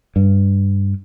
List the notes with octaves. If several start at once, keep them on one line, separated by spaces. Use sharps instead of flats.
G2